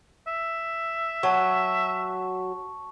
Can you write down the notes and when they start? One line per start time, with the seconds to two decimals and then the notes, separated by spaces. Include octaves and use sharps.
0.27 E5
1.23 F#3 A5 C#6